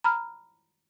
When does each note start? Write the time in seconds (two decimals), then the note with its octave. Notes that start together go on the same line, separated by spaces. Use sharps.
0.04 A#5 B5 F6